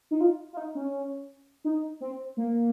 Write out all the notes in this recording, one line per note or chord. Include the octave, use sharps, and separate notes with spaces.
D#4
F4
F4
D#4
C#4
D#4
C4
A#3